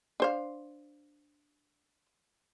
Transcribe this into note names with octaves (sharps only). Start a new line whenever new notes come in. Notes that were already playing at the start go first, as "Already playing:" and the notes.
D4 C5 F5